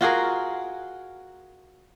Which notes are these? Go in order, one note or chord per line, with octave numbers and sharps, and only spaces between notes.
F4 F#4 G#4 A#4